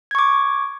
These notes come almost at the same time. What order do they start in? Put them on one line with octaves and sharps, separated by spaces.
G#6 C#6 D6